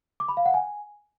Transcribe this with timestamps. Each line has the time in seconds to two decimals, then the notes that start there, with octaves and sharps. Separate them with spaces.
0.20 D6
0.29 B5
0.37 F5
0.46 F#5
0.54 G#5